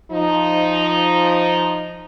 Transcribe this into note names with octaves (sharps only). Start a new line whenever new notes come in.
F3 D#4